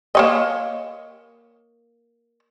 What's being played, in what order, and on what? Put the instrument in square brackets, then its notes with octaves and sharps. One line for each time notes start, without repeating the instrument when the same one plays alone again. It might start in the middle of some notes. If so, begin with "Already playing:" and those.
[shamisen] A#3 C#5 D#5